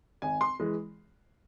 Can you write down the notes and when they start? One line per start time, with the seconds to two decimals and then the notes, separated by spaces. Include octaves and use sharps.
0.22 G#1 G#5
0.41 C6
0.60 E3 G#3